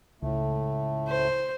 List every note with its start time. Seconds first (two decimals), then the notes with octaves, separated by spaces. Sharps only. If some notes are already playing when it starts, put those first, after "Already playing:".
0.22 C#2 A2 A3
1.09 C5